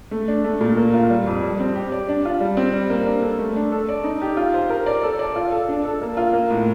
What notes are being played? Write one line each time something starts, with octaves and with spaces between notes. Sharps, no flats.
A3
D4
A3
A#2
A#3
F4
G3
F2
G3
C4
G4
D5
D4
F4
G3
C4
G3
A#3
D4
A4
A3
D4
A4
D5
D#4
G4
F4
C5
A#4
D5
A4
D5
F4
A4
D4
A4
A#3
F4
A#3
A2